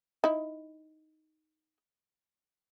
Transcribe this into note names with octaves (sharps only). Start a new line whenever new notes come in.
D#4 E4